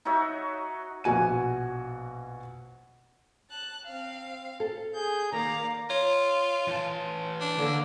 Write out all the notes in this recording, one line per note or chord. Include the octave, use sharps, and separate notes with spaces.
D#4 F#4 C#5 E5
A#1 B2 F#4 G#5 D#7
A5 F#6
C4 F5
A4
G#4 G6
D#3 A#3 D5 F5 A#5
F4 C#5
E3 A5
D4
D3 A#3